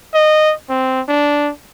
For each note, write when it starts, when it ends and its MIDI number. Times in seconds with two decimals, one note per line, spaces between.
0.14 0.53 75
0.69 1.01 60
1.08 1.51 62